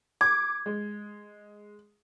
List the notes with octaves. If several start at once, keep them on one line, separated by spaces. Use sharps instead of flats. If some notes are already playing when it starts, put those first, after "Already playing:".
D6 G#6
G#3